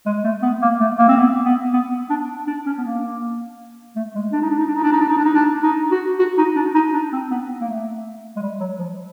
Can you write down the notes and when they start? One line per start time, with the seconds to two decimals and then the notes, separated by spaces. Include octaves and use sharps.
0.06 G#3
0.24 A3
0.43 B3
0.62 A#3
0.81 A3
0.99 A#3
1.08 C4
1.17 B3
1.45 B3
1.73 B3
2.10 D4
2.47 D4
2.66 C#4
2.78 B3
2.85 A#3
3.96 A3
4.15 G#3
4.33 D4
4.42 D#4
4.50 D4
4.59 D#4
4.67 D4
4.76 D#4
4.83 D4
4.93 D#4
5.01 D4
5.09 D#4
5.17 D4
5.25 D#4
5.34 D4
5.63 D#4
5.91 F#4
6.19 F#4
6.38 D#4
6.56 D4
6.75 D#4
6.94 D4
7.12 C4
7.31 B3
7.61 A#3
7.68 A3
8.36 G#3
8.42 G3
8.60 F#3
8.79 F3